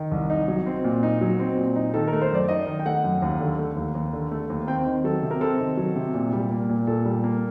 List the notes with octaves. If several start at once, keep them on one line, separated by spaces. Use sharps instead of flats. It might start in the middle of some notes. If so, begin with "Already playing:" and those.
Already playing: D#3
C2
D#4
F#3
C4
A#2
D#4
F#3
C4
A#2
D#4
D#3 A4
A#4
A3
C5
F#2 D5
D#4 D#5
D#3
G5
A3 F#5
F#2
D#2
D3
A3
D#2
D#2
D3
A3
D#2
C4 G5
D#3
F#3 A4
C3
A#4
C4 A4
D#3
F#3
C3
A#2
G3
A#3
A#2
A#2 A4
G3
A#3